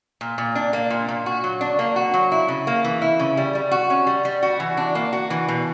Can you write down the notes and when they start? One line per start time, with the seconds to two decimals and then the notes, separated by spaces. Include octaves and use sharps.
0.21 A#2
0.38 A#2
0.55 D4
0.73 A#3
0.90 A#2
1.09 A#2
1.26 F#4
1.44 F#3
1.61 D4
1.79 A#3
1.96 F#4
2.14 F#3
2.32 E4
2.48 C#3
2.67 A#3
2.84 E3
3.02 E4
3.19 C#3
3.37 G3
3.55 G3
3.71 F#4
3.90 C#4
4.07 G3
4.25 G3
4.43 F#4
4.60 E3
4.77 D4
4.95 A#3
5.13 F#4
5.30 E3
5.48 B2